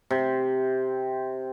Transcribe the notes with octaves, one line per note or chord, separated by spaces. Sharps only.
C3